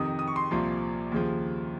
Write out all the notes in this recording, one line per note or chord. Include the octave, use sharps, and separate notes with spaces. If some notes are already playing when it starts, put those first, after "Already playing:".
Already playing: F2 C3 D#3 D#6
D#6
C#6
C6
C2 A#2 F3 C6
D#2 C#3 F3